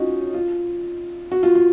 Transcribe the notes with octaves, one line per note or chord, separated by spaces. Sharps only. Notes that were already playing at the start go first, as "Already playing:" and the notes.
Already playing: C#4 D#4 F4 F#4
F4
F#4
F4
F4